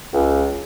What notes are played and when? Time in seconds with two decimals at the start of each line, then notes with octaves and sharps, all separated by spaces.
0.13 C#2